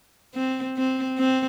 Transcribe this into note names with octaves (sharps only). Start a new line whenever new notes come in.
C4
C4
C4